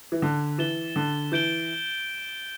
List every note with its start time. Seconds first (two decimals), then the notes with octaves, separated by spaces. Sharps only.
0.12 E3
0.22 D3
0.58 E3 A6 E7 G7
0.96 D3
1.32 E3 G6 D7 G7